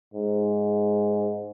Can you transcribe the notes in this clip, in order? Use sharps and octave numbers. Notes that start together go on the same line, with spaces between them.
G#2